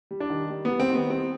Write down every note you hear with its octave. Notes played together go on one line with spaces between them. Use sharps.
G3
D4
D#3
G3
B3
G3
C4
D#3 B3
G3 C4